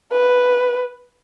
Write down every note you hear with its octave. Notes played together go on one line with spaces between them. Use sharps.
B4